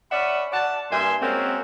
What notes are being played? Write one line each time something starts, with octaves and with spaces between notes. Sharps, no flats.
C#4 D5 E5 F#5 B5
D5 F#5 A5
G2 A#3 E5 G#5 C6
G#3 A#3 C4 C#4 F#4